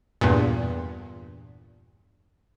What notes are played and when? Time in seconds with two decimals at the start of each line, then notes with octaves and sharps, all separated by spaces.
0.21 E2 G2 A#2